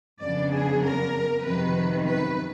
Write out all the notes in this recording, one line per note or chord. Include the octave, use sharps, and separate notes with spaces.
F2 C#3 F#3 B3 D4 D5
G#4
A#4
F2 C3 D#3 F#3 B4
B4